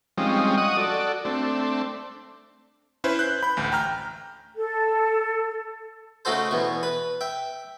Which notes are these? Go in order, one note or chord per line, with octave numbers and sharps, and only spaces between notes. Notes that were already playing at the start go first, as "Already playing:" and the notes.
F3 G3 G#3 C4 C#4 D#4
D#5 F#5 C#6 D#6
F#4 A4 D5
A3 C4 D4
C#4 E4 B4 C5
F#6 G6
B5 G6
A1 D2
G5 A#5 F6 G6
A4
C#3 A3 D#4 F#4 A4 C5
E2 B2 C#6
B4
E5 G5